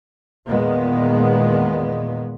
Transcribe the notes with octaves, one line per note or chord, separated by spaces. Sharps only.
E2 A#2 D#3 G#3 B3